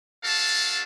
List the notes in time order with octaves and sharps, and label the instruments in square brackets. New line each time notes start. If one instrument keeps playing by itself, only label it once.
[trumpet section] G#3 D4 F#4 A4 F5 A5